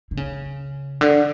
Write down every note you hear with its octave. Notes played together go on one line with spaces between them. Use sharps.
D3
C#3
D3